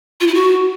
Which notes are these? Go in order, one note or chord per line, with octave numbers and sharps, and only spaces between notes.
F4
E4
F#4